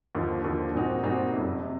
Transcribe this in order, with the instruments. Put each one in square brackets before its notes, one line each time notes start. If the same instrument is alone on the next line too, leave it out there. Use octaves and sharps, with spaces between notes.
[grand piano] D#2 D3 F3
D#2 D3 F3
A#2 G3 C4 D#4 F#4
A#2 G3 C4 D#4 F#4
F#1 F2 C3
C3